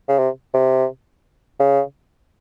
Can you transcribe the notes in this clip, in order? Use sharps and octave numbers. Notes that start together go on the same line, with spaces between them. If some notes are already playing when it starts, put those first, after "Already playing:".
C#3
C3
C3
C#3